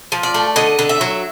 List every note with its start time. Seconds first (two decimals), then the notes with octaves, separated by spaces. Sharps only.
0.12 F3
0.23 D5
0.34 A3
0.56 D3 D#5
0.79 D3
0.89 E5
1.01 F#3